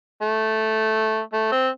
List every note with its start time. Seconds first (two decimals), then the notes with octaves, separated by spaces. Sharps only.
0.22 A3
1.33 A3
1.52 C4